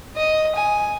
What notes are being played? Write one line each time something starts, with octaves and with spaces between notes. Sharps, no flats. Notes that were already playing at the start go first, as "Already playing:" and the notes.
D#5
G#5